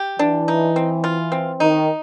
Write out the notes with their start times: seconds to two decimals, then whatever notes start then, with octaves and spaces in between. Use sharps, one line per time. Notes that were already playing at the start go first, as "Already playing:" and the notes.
Already playing: G4
0.19 E3 D4
0.48 D#4
0.76 C4
1.04 F4
1.32 C4
1.60 D#3 D#4